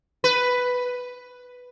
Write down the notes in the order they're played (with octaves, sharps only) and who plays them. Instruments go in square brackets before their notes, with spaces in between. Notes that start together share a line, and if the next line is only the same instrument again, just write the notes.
[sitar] B4